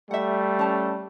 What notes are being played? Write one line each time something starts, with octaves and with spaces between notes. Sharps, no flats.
G3 A3 E5 F#5
C#4 A5